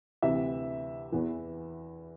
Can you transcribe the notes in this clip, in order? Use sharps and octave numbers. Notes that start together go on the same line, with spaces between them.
D2 C3 E3 E5
E2 E3